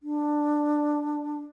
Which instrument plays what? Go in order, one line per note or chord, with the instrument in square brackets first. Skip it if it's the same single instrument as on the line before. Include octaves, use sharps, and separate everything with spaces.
[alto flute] D4